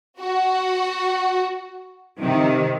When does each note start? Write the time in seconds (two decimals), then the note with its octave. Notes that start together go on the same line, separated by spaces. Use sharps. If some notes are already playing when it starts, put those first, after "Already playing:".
0.20 F#4
2.19 C3 D#3